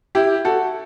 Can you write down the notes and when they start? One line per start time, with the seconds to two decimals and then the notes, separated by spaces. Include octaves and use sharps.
0.15 E4 G4
0.45 F#4 A4